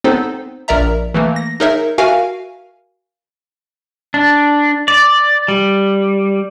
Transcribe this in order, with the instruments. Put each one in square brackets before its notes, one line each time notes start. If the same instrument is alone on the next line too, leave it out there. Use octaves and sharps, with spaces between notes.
[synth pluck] B3 C4 D#4 A4 C5
A#1 A#4 D5 E5 A#5
E3 A3 A#3
A#6
D#4 G#4 A#4 C#5 E5
F#4 A#4 E5 F5 G#5
[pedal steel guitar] D4
D5
G3